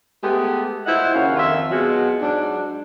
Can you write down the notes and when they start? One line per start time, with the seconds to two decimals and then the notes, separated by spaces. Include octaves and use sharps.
0.24 G#3 A3 B3 G4
0.86 E4 F4 C5 D#5 F#5
1.15 D#2 C#3 C#4 F#4 F5
1.36 F2 D#3 F4 F#4 E5
1.71 B2 F#3 G#3 F4 F#4
2.21 G#2 F#3 D4